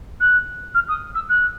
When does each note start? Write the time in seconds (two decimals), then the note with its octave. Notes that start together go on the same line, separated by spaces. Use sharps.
0.20 F#6
0.74 F6
0.88 D#6
1.15 E6
1.29 F#6